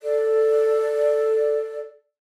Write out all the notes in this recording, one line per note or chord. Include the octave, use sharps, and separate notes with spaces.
A4 D5